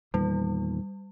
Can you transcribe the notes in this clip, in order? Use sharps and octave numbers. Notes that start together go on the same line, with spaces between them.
E2 A#2 D#3 G3